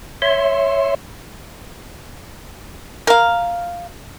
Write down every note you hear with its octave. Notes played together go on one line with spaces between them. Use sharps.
C#5 E5 C6
A#4 F5